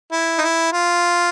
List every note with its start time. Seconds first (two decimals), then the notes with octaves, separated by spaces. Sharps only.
0.12 E4
0.38 D#4
0.42 E4
0.73 F4